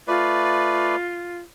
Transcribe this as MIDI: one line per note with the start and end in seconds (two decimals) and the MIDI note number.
0.08 0.96 57
0.08 1.38 65
0.08 0.96 71
0.08 0.96 74